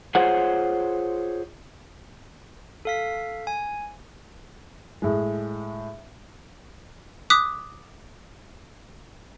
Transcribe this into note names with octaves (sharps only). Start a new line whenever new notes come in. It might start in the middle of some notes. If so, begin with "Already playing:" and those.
F4 G#4 C5 C#5 F#5
A4 F5 B6
G#5
A2 G#3
D6 D#6 F#6 B6